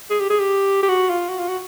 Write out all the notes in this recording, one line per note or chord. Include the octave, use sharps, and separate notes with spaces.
G#4
G4
G#4
G4
G4
F#4
F4
F#4
F4
F#4